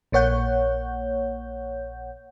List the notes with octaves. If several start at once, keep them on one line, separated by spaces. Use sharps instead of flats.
A#1 A#3 C#5 F#5 G6